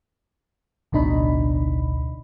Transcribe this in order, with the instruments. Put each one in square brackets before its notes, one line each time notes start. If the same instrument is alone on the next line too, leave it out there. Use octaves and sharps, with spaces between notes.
[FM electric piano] A1 D2 B2 D4 D#4 B5